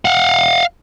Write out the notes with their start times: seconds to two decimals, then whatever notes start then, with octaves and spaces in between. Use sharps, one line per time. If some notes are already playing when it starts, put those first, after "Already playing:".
0.05 F5 F#5